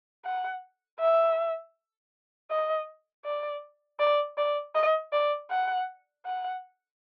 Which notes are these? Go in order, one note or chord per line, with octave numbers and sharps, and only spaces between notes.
F#5
E5
D#5
D5
D5
D5
D#5
D5
F#5
F#5